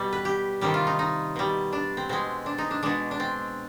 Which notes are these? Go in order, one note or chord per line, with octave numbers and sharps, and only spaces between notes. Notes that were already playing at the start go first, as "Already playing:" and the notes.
Already playing: B2 G3
B4
G4
C3 D#3 G3 G4
F4
D#4
D#4
B2 G3
D4
C4
B2 G#3 C4
D4
D#4
D4
B2 G#3 D4
D4
C4